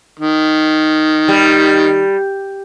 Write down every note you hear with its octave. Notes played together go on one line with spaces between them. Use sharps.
D#3
G3